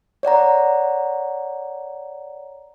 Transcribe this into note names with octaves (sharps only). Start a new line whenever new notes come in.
C#5 D5 F#5 A#5